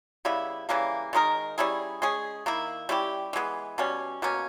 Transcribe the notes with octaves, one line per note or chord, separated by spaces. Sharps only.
C#3 G3 B3 E4
C#3 E3 G3 A#3
D#3 G#3 D#4 A#4
G3 C#4 E4 G#4
G#3 C#4 G#4
D#3 A#3 E4
G3 C#4 E4 G4
E3 G#3 B3
B2 G3 C#4
B2 A#3 C#4